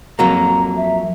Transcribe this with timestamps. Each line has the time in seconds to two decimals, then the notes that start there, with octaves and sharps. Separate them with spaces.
0.19 F2 F#3 A#3 A#5
0.77 E5